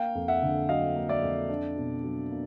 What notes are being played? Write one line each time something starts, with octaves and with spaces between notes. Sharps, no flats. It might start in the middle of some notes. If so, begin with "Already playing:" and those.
Already playing: A#3 F5 G5
F2
E5 F#5
D3
F#3 D#5 F5
A#3
D5 E5
F2
D4
B2
F#3
A#3